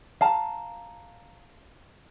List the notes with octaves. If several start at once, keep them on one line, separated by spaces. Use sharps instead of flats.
F5 A5 A#5